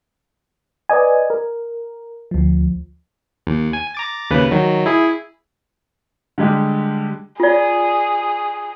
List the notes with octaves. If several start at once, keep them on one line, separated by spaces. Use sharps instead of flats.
B4 D5 D#5 G#5
A#4
D2 F3
D#2
G#5
A#5 D6 A6
D#2 C#3 B4
D#3 F#3
E4 G#4
D3 G3 G#3 G4
F4 G#4 D5